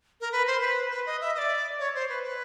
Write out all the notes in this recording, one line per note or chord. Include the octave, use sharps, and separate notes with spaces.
A#4
B4
C5
B4
B4
D#5
E5
D#5
D5
C#5
C5
B4
B4